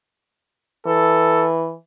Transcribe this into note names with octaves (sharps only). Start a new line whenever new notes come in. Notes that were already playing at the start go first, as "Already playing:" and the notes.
E3 A4